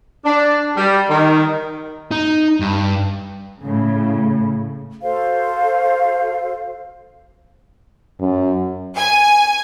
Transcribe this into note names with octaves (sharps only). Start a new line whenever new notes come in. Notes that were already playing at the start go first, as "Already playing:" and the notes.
D4
G3
D#3
D#4
G2
A2 C#3
F#4 A4 C5 F5
F#2
G#5